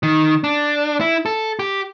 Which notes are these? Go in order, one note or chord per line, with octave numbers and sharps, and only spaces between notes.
D#3
D4
E4
A4
G4